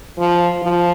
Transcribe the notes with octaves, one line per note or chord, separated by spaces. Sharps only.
F3
F3